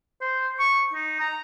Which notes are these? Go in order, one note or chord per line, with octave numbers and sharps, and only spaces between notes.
C5
C#6
D#4
A#5